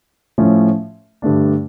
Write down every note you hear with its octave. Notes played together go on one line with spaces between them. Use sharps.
A2 F3 A3 C#4
G2 D3 A3 D4